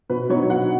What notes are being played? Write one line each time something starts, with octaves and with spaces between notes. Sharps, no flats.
B2 B4
F#3 B3 D#4 C#5
B2 F#5